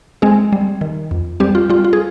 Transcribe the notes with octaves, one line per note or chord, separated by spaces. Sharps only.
G#3 C4 G#4
G3
D#3
F2
G3 C4 G4
F4
G3 F4
F4
G#4